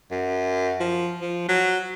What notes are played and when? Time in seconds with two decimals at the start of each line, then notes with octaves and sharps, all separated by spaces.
0.11 F#2
0.80 F3
1.21 F3
1.49 F#3